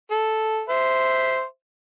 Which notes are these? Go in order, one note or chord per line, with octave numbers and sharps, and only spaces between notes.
A4
C5 E5